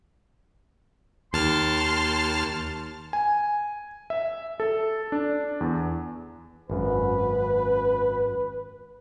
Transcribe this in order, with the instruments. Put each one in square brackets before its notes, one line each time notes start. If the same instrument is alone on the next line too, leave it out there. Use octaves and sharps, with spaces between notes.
[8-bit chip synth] D#2 A5 F6 [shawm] C6
[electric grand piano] G#5
E5
A4
D4
E2
[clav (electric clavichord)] G#1 F#2 [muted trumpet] B4